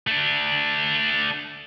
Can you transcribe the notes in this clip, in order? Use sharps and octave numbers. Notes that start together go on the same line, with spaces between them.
A3 D4